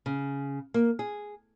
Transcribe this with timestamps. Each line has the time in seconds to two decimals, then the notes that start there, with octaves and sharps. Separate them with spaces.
0.06 C#3
0.74 A#3
0.99 G#4